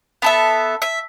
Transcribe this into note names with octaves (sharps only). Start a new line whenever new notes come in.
B3 A4 E5
E5